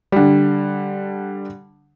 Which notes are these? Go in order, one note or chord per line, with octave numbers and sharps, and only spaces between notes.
D3 G3